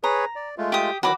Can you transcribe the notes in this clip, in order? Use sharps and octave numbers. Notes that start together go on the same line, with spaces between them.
G#4 B4 C#5 A#5
D5
G#3 A3 F4
G4 D#6
D#3 E3 F#3 F#4 B5 D6